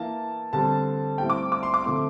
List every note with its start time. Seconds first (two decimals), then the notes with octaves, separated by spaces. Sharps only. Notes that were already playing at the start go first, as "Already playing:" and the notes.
Already playing: E3 A#3 A5
0.53 D3 G3 C4 A5
1.18 A2 G3 C4 G5
1.30 D6
1.52 D6
1.63 C6
1.74 D6
1.84 D3 F3 A3 C4 C6